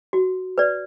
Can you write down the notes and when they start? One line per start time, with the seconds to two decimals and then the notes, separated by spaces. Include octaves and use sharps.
0.13 F#4
0.58 B4 D5